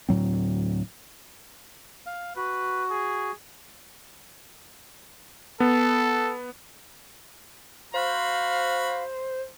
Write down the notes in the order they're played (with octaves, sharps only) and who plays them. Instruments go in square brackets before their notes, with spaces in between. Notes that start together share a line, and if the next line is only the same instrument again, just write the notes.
[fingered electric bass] D2 A2 F#3 C4
[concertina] F5
[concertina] F#4 [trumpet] B4
[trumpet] G#4
[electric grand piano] B3 [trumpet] A4
[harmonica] F#4 B5 [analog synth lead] C5 [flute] F5